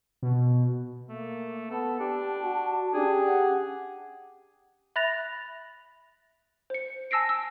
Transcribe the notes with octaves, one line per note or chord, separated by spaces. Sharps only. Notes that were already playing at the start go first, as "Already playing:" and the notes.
B2
A3 A#3
B3 A4 A5
D4 G4
F#4
C#4 D4 G4 G#4
F#5
E5 B5 F#6 A6 A#6 F7
C5 C#7
G#5 A5 E6 A#6 C7 D7
E6